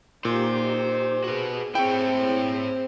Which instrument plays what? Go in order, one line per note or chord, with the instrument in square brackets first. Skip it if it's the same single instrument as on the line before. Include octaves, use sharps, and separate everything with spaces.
[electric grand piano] A#2 [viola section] D#4 G4 [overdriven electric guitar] C5
[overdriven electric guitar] B3 F#4 [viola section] G#4
[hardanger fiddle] C4 C5 [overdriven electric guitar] E4 C#5 [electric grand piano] G5